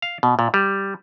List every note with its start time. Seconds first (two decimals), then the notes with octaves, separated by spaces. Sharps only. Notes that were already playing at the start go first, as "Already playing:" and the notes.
0.02 F5
0.23 B2
0.39 A#2
0.54 G3